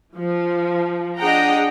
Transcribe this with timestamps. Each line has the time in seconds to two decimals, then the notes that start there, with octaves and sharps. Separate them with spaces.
0.15 F3
1.18 D4 G#4 D#5 F#5 G5 A#5